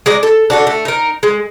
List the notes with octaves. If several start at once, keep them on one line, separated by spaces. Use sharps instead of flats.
G#3 D5 A#5
A4
D4 F#4 A4
A3
D#4 A#4
G#3